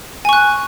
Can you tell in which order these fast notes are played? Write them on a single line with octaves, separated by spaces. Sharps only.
G#5 C#6 F#6